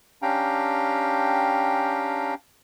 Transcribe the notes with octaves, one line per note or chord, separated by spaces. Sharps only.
C#4 D4 G4 F5 G5 A#5